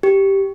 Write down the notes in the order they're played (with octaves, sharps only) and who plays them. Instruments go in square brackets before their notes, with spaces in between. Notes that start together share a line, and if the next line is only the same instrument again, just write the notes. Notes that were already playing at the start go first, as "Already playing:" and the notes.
[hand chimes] G4